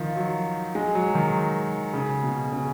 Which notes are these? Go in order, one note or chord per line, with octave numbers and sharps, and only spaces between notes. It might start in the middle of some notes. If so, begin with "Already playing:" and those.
Already playing: D#3 F3
F#3
G#3
F#3
D#3
C#3
B2
C#3